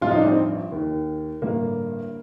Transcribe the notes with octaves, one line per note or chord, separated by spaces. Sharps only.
A1 G2 F3 F4
D#4
D4
C4 D#4
D#2 D#3
A1 G2 D3 A#3